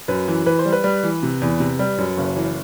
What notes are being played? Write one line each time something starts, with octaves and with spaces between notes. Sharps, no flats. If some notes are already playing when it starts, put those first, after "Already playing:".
F#2 B4
E3
E3 B4
C5
G3
B4
G3
E3
C3
E2
C3
G3
F#2
F#1
E3